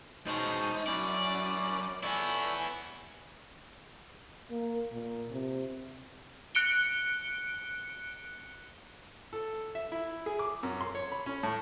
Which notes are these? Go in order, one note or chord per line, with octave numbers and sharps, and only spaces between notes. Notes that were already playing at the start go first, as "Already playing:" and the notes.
B2 G#3 C#4 D#4 C5 A5
F#2 C#4 E4 D5
B3 E4 A4 C#5 D5 G#5
A#3
A#2
C3
F#6 C#7 D7 G7
A4
E5
E4
G#4
D6
F#2
C6
C#5
B5
C#4
A2